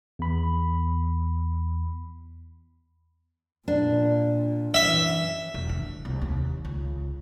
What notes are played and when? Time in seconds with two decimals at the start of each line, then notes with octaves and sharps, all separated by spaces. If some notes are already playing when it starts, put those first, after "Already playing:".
0.19 E2 B5
3.68 A#2 D4
4.74 F#2 E3 E5
5.54 E1
5.69 D4
6.05 C2
6.22 D#2
6.65 C#2